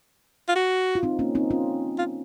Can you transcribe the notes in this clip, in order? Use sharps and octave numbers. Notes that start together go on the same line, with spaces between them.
F4
F#4
F4
C4 D#4
A#3 C#4
C4 D#4
C#4 F4
F4